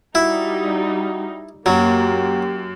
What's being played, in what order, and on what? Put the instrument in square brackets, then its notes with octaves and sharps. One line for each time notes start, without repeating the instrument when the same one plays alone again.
[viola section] G3 D#4 [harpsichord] E4 [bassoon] F#4
[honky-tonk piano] F#2 [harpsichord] F#3 [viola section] A#3 [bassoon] G4